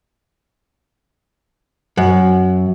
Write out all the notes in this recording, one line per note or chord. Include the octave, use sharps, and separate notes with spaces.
F#2